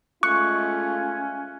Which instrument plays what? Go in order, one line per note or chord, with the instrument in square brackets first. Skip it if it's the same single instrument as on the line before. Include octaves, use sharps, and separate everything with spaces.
[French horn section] G#3 A3 F4 [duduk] C#4 [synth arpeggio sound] C#6 [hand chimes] F#6